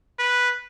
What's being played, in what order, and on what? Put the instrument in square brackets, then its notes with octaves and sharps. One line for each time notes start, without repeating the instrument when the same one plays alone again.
[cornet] B4